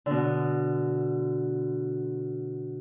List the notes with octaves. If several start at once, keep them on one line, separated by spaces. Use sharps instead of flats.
B2 D3